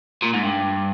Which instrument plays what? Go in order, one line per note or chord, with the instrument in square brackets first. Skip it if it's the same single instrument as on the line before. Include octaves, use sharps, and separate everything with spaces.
[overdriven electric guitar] A#2
G#2
G2